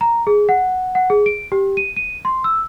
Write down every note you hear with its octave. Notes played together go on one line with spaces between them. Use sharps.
A#5
G#4
F#5
F#5
G#4
D7
G4
D#7
D#7
C6
E6